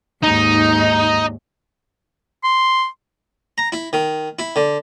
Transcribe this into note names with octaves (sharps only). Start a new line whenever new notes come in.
D#2 G#2 D#4
C6
A#5
E4
D#3
E4
D3